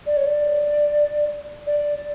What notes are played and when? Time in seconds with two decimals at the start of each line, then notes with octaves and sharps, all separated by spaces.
0.06 D5
0.17 C#5
0.26 D5
1.67 D5